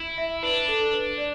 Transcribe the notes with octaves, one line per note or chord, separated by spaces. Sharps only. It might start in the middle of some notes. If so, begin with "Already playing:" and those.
Already playing: E4
E5
D4 B4
A4
B4
D5